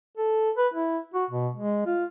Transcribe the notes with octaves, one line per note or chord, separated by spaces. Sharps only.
A4
B4
E4
F#4
B2
G#3
F4